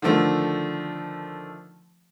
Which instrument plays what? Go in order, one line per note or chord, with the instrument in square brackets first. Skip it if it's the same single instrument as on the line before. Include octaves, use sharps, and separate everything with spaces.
[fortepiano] D3 D#3 F3 A3